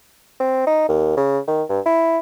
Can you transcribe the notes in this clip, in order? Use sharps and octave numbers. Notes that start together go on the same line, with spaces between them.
C4
D#4
D#2
C#3
D#3
G2
E4